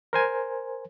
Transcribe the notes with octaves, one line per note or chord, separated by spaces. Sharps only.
A#4 C5 G#5